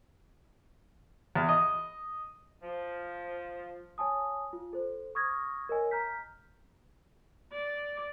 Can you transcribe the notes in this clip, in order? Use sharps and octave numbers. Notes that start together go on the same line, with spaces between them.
E2
D#5
F3
C#5 G#5 A5 D#6
F4
A4 C5
C#6 D#6 F6 G#6 A#6
A#4 C#5 D#5 G#5
A#5 F6 G6 B6
D5